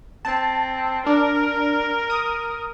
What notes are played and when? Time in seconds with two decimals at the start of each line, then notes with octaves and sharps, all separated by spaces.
0.25 C4 A5
1.06 D4 A#4
2.10 D#6